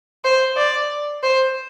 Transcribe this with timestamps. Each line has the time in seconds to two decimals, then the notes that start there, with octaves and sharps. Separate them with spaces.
0.25 C5
0.57 D5
1.23 C5